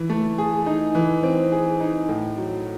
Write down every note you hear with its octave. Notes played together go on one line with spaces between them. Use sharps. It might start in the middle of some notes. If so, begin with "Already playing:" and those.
Already playing: E3
A3
G#4
D#4
E3
C4
G#4
D#4
A2
F#3